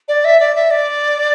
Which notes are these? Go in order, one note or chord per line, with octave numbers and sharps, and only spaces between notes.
D5
E5
D5
E5
D5